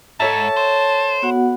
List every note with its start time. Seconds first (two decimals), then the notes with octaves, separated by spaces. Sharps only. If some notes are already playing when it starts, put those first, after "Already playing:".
0.20 G#2 A4 C#5 E5 A5
0.57 C5
1.22 B3 F#4 F#5